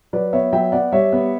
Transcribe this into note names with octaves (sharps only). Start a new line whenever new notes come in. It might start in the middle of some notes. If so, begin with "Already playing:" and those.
F#3 B4 D5
B3 C#5 E5
F#3 E5 G5
B3 D5 F#5
G3 C#5 E5
B3